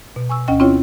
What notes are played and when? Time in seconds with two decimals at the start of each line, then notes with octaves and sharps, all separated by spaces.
0.16 B2
0.29 G#5 C#6 E6
0.48 D2 C#4 D#5 G5
0.60 C4 C#4 E4 F4 C#5 G5